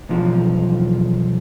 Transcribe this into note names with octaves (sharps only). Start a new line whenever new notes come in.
B1 E2 F3